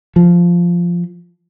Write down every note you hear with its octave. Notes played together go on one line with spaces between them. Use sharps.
F3